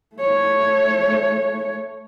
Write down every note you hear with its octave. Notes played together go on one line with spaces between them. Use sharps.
A3 C#5